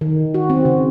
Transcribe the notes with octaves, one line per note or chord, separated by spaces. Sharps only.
D#3
F#4
C4
C#3